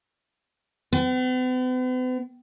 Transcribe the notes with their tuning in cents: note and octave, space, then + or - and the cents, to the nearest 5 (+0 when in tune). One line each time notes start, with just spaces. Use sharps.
B3 +45